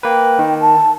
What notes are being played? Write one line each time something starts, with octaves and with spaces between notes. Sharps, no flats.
A#3 B4 G5
D#3
A5